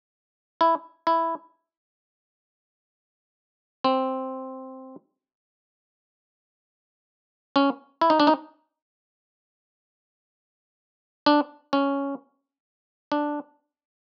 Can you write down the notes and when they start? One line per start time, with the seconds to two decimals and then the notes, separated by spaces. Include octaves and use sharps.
0.61 E4
1.07 E4
3.84 C4
7.56 C#4
8.01 E4
8.10 D#4
8.20 D4
8.27 D#4
11.26 D4
11.73 C#4
13.12 D4